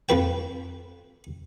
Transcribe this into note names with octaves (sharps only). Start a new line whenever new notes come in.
F2 F3 B4 G5